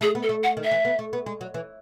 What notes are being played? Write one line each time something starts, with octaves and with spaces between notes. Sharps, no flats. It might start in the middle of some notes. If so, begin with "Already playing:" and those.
A3 G#4
B3
A4
A3
F#5
D#3
E5
E3
B3
A3
B3
G#3
F#3
E3